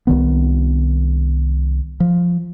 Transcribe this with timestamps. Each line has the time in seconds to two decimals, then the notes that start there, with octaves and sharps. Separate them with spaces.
0.07 C2 D#3 B3
2.00 F3